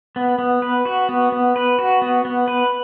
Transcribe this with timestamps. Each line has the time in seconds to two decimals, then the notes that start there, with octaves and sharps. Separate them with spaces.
0.16 B3
0.39 B3
0.62 B4
0.85 F#4
1.09 B3
1.32 B3
1.56 B4
1.79 F#4
2.02 B3
2.25 B3
2.48 B4